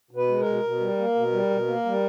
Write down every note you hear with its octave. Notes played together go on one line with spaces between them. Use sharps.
B2
B4
G#3
A#4
B2
B2
G3
A#3
B2
G3
B2
A#3
G3